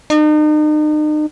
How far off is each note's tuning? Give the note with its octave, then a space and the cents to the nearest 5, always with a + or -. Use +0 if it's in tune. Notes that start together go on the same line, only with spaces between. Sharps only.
D#4 -40